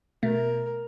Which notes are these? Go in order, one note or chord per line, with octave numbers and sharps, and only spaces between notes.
B2 A3 A#4